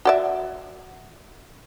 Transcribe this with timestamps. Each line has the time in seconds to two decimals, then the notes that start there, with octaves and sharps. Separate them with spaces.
0.05 F#4 D5 E5